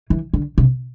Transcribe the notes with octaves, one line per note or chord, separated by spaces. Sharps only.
E3
D3
C3